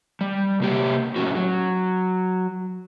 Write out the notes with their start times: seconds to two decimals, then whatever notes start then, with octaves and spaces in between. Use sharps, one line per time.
0.21 G3
0.60 C3 A#3 G4
1.16 A2 C#4 F#4
1.35 F#3